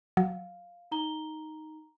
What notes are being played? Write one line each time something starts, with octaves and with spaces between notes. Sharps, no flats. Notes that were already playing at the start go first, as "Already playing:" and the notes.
F#3 F5
D#4 A#5 G7